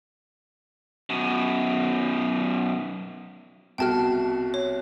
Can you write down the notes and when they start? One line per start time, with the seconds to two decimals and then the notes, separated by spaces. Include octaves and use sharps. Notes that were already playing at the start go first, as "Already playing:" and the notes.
1.10 F#2 B2
3.78 C2 B2 F#4 G5 A5 F6
4.54 C#5